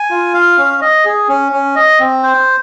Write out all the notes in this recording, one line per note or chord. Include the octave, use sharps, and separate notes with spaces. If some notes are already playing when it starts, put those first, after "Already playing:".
Already playing: G#5
F4
F5
C#4
D#5
G#4
C#4
C#4
D#5
C4
C5